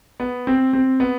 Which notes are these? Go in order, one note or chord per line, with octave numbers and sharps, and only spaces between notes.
B3
C4
C4
B3